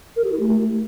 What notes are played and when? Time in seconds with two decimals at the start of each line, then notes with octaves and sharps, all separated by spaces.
0.16 A#4
0.24 G4
0.32 E4
0.40 A3